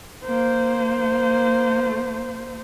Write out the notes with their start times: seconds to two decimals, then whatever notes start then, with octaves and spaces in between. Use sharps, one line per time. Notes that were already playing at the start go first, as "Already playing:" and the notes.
0.25 A#3 C5